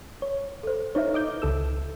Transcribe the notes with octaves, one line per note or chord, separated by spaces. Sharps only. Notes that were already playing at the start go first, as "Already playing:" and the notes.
C#5
A4 C5
D#4 E4 B4 C#5 E5
D#5 D6 G6
C#2 A4 E6